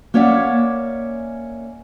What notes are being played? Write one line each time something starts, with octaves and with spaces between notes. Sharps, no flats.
A#3 C#4 C#5 D5 E5 F#5